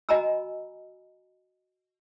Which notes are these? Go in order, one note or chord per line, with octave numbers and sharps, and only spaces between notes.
F#4 D#5 G#5 A#5 B5 E6